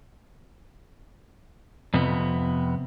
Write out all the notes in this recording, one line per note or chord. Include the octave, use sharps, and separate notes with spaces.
F2 C3 B3